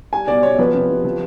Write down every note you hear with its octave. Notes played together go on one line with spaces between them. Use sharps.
G3 G#5
B2 D5
B2 C#5
F3 B4
C3
C3
F3